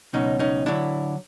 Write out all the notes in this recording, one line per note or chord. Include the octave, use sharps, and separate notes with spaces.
C#2 B2 F#3 C#4 D#4
C#4 D#4
D3 F#3 D4 E4